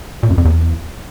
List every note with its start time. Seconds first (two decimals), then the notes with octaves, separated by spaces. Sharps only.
0.23 A#2
0.30 F#2
0.38 F2
0.45 E2